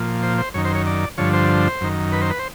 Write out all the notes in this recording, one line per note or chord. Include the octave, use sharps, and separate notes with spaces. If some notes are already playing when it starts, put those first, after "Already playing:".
Already playing: A#2 F3
C5
C5
F#2 D#3 C#5
C5
C#5
D5
G2 D3 F3 C#5
C5
F#2 D#3
B4
C5
B4
C5